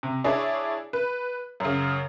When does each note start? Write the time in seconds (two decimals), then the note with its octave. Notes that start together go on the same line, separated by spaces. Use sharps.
0.03 C3
0.24 D4 E4 G#4 C#5 D5
0.93 B4
1.60 F#2 C#3